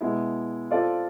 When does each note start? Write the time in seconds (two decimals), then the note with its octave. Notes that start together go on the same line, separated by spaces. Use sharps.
0.01 B2 G#3 B3 E4
0.71 C4 F4 A4 D5